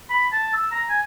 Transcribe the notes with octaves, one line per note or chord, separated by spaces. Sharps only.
B5
A5
E6
A#5
G#5